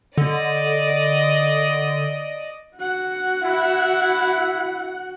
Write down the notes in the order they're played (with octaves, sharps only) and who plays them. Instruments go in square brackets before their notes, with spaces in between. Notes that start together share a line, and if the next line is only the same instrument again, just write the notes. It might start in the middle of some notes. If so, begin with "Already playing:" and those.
[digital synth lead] D3 [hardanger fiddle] D5 D#5
[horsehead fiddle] F#4 F#5
[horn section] E4